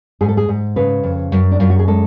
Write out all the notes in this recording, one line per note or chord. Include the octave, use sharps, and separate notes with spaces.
G#2 G#4
A4
G#4
G#2
C#3 B4
F2
F#2
D4
F#2 F4
F#4
G#4
G#3 A4